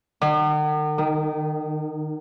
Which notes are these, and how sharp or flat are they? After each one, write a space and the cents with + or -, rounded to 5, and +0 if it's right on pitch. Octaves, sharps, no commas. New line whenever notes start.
D#3 -45
D#3 -5